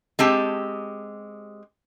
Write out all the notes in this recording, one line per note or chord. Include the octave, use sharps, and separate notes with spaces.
G#3 C4 G4 A5